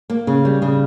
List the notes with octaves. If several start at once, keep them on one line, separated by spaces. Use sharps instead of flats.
A#3
C#3
G3
C#3